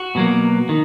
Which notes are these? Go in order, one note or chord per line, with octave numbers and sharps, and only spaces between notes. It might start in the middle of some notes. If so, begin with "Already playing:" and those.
Already playing: F#4
B2 F#3 A#3
D#3